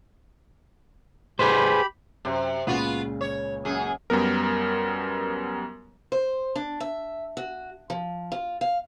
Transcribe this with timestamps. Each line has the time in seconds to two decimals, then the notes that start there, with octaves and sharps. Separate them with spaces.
1.39 G4 G#4 B4 C5 B5
2.25 F#2 C3 G4 C5
2.67 C#2 A#2 C#3 B3 F4 F#4
3.21 C#5
3.65 F#2 G#4
4.10 F#2 G3 B3 A#4
6.12 C5
6.56 D4
6.80 E5
7.37 F#4
7.90 F3
8.32 F4
8.61 F5